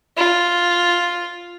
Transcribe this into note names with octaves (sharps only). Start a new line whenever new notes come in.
F4